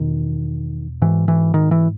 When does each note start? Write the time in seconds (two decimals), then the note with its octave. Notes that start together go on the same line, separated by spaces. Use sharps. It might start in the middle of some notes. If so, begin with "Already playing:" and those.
Already playing: E2 B2 D#3
1.02 G#2 E3
1.28 E3
1.54 D#3
1.71 E3